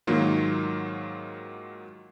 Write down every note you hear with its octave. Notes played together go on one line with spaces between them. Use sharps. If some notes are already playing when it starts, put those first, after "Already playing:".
G#2 D#3 F#3 A#3 F4